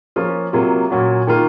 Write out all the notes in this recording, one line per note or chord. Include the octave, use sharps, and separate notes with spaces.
F3 A#3 C#4 F4
C3 F#3 A#3 F4
A#2 F#3 C#4 F#4
D#3 A#3 F4